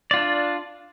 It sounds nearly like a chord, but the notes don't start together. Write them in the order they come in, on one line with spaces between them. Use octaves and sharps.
D5 F4 D4